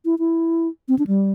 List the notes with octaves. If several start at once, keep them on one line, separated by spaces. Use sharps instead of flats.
E4
E4
C4
D4
G3